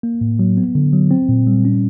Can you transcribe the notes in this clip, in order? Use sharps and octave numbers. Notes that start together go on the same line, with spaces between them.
A#3
A2
F#3
B3
D3
F#3
C4
A#2
G3
C#4